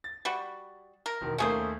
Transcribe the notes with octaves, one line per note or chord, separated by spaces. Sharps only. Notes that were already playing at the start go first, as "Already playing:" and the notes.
A6
G3 F#4
A#4
E1 D#3
D#2 A3 A#3 C#4 G#4 C5